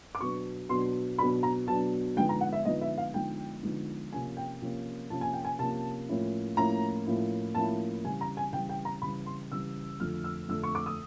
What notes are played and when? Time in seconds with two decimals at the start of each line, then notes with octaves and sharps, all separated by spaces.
0.15 D6
0.20 B2 F#3 B3 D4 C#6
0.69 B2 F#3 B3 D4 C6
1.18 B2 F#3 B3 D4 B5
1.43 A#5
1.68 B2 F#3 B3 D4 A5
2.16 D3 F3 G#3 B3 D#4 G5
2.29 A#5
2.41 F#5
2.53 E5
2.65 D3 F3 G#3 B3 D#4 D#5
2.81 E5
2.98 F5
3.14 D3 F3 G#3 B3 D#4 G5
3.63 D3 F3 G#3 B3 D#4
4.13 C3 F3 A#3 C#4 G#5
4.37 G5
4.62 C3 F3 A#3 C#4
5.10 C3 F3 A#3 C#4 A5
5.21 G#5
5.33 G5
5.45 G#5
5.59 C3 F3 A#3 C#4 A5
6.09 A2 F3 A#3 C#4 E4
6.57 A2 F3 A#3 C#4 E4 A#5
7.06 A2 F3 A#3 C#4 E4
7.54 A2 F3 A#3 C#4 E4 A5
8.04 C#3 E3 G3 G#5
8.21 A#5
8.37 G#5
8.53 C#3 E3 G3 G5
8.69 G5
8.85 A#5
9.02 C#3 E3 G3 B5
9.26 C6
9.51 C#3 E3 G3 E6
10.00 F2 D3 F3 A3 F6
10.24 E6
10.48 F2 D3 F3 A3 E6
10.63 C#6
10.75 D6
10.86 D#6